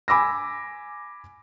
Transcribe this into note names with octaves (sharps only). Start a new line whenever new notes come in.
G#5 B5 D6 E6 A#6